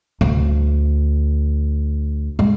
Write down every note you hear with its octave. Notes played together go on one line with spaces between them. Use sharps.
D2
G#3